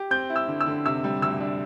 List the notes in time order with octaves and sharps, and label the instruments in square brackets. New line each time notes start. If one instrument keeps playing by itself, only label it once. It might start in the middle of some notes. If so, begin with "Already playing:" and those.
Already playing: [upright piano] G4
[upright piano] C4 [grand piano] G6
[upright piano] E4
[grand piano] E6
[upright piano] D3
[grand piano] E6
[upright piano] D3
[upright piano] C3 [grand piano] E6
[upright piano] G3
[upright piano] D2 [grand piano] E6
[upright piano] D4